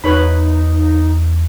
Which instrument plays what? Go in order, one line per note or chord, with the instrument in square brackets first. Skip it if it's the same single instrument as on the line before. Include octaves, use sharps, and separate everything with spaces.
[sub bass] E2 [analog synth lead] D#4 [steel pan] B4 C#5 B5